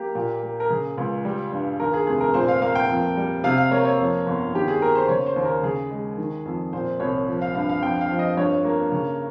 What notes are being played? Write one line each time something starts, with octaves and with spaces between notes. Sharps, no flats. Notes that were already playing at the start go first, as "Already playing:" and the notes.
Already playing: A#3 G4
A#2
A#3
A#4
C#3 G#4
C#2
G3
G2
D#2 A#4
G#4
F1 G#4
A#4
A#2 C5
F5
A#3 F5
G5
F2
G3
C3 F5
F5
A#3 C#5
C#5
F2
G1
D#3 G4
G#4
A#3 A#4
C5
C#3 C#5
C5
D#2
A#4
C#3 G#4
G#3
D#3
F2
A#2 C5
C2 C#5
F3
F5
G2 F5
F5
F2 G5
F5
F3
D#5
G2 C#5
A#3
C#3